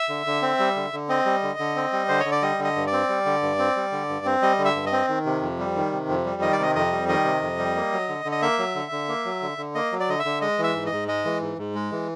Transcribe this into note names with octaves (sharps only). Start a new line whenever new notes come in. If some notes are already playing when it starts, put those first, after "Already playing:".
Already playing: E5
D3
D3
C4
G3
D3
D3
C4 D#5
G3
D3
D3
C4
G3
D3 C5
C#5
D3
D5
G3 D#5
D3
D#5
G2
D5
C4
G3
D3
G2
C4
G3
D3
G2
C4
G3 D#5
D3
E5
G2
D#5
C4
D#3
C3
F2
G3
D#3
C3
F2
G3
D#3 D#5
D5
C3 D#5
F2 D#5
G3
D#3 D#5
C3
F2
G3
A#3
F#3
D3
D3
D#5
A#3 E5
F#3
D3
D3
A#3
F#3
D3
D3
A#3 D#5
F#3
D5
D3 D#5
E5
D3
G#3 D#5
E3
E5
G#2
D#5
G#2
G#3 D#5
E3
G#2
G#2
G#3
E3